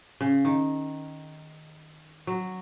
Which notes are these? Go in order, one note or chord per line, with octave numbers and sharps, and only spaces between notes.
C#3
D#3
F#3